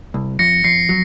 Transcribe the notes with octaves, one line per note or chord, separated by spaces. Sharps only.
C2
F2 A#6 C#7
F2 C7
F#3